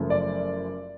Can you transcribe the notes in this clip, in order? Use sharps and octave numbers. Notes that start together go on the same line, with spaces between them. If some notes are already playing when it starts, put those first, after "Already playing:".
Already playing: F#1 F#2 C#3 F3 A3
D5